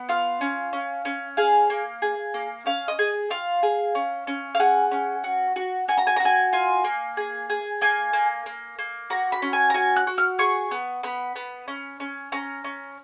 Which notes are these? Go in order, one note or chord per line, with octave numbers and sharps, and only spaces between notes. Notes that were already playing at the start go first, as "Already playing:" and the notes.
Already playing: B3
F4 F5
C#4
C#4
C#4
G#4 F5
A#3
G#4
A#3
C#4 F5
D#5
G#4
F4 F5
G#4
C#4
C#4
F5
G#4 F#5
C#4
F#4
F#4
F#4 G#5
A#5
G#5
A#5
F#4
G#5
F4 G#5
A#3
G#4
G#4
A#3 G#5
A#3
A#3
A#3
F#4 A#5
B5
C#4
G#5
A#5
F#4 G#5
F#6
F#4
F6
G#4 C#6
B3
B3 B5
B3
C#4
C#4
C#4 A#5
C#4